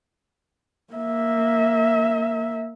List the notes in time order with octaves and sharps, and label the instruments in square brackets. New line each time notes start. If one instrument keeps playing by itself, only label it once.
[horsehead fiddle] A#3 E5